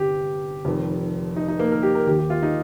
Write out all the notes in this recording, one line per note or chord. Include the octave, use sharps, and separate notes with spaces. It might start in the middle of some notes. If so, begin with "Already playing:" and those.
Already playing: G1 C3 G4
F1 F2 D#3
D#4
D#4
A#3
A#4
G4
A#4
D#2 D#3 G4
G4
F4
D#4